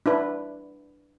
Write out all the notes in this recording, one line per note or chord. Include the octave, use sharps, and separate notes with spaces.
D4 E4 B4